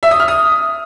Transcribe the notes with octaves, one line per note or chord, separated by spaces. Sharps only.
E5
D#6
F6
D#6